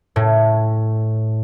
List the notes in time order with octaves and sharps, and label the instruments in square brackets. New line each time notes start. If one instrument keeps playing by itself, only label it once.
[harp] A2